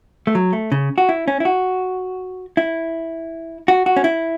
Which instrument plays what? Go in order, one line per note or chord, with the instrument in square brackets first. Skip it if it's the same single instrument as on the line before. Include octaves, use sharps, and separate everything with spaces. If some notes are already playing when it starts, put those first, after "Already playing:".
[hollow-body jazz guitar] A3
F#3
A3
C#3
F#4
E4
C#4
E4
F#4
E4
F#4
F#4
C#4
E4